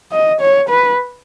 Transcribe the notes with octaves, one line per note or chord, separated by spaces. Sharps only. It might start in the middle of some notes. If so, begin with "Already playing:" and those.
D#5
C#5
B4